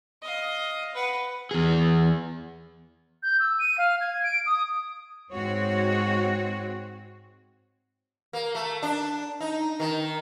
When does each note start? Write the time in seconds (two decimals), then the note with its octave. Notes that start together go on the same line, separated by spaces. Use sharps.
0.22 D#5 F5
0.94 B4 F#5
1.51 E2 G#4
3.23 G6
3.40 E6
3.59 D#7
3.78 F5
4.01 G#6
4.24 D7
4.46 D#6
5.32 G#2 C4 F#4 C#5
8.33 A#3
8.55 A3
8.83 D4
9.41 D#4
9.80 D#3